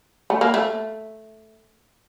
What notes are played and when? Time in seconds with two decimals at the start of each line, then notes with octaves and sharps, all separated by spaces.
0.30 A3
0.41 A#3
0.54 A3